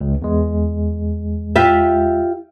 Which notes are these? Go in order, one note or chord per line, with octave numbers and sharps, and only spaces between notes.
C#2
E2 G#3
F4 G4 E5